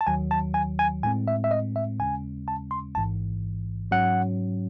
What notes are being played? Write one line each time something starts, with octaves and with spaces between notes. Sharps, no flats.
A5
D#2 D#3 F#3 G#5
A5
G#5
G#5
A2 G#3 C4 G#5
E5
E5
D#5
E5
D#2 C#3 G#3 C#4 G#5
A5
C6
A1 G#2 E3 A5
G#2 F#3 C#4 F#5